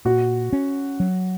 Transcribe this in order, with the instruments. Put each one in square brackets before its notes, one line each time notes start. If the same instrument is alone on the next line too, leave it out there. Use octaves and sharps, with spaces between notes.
[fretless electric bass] A#2 [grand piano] F#4
[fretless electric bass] C#4
F#3